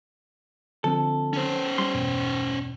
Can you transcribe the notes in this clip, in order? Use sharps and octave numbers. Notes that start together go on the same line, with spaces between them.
D3 F3 C4 A4
C#4 C5
G3 C6
E2 G2 B2